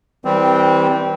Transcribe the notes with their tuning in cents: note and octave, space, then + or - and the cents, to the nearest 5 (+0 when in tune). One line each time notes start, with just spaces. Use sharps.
E3 -30 G3 +0 C4 -15